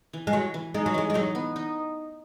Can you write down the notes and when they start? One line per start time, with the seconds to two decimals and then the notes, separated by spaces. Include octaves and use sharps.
0.13 E3
0.27 G#3
0.33 E3 F#3
0.54 E3
0.74 G#3 D#4
0.86 F#3
0.94 E3 G#3
1.10 G#3
1.14 F#3 D#4
1.35 B3
1.56 D#4